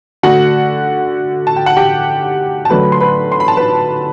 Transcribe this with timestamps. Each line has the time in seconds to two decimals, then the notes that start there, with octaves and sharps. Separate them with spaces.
0.23 D3 A3 F#4 F#5
1.47 A5
1.56 G5
1.66 F#5
1.77 G4 G5
2.65 A5
2.70 D3 F#3 A3 B4 B5
2.92 C6
3.00 B4 B5
3.32 C6
3.40 B5
3.48 A5
3.57 B4 B5